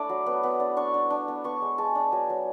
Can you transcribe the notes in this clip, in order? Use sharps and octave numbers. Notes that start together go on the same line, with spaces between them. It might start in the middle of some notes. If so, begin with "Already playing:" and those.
Already playing: A3 D4 E4 A5 B5 D6
F#3
B3
B3
D4
D4 C#6
D4
D4
B3
B3 C#6
G#3
G#3 A5
D4
F#3 G#5
F#3